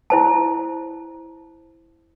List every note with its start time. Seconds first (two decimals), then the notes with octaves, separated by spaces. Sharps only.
0.10 E4 C5 A5